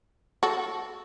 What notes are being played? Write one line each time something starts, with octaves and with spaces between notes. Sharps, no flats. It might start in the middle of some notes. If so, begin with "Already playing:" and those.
F#4 A4